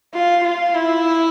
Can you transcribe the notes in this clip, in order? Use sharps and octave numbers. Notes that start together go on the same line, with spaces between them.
F4
F4
E4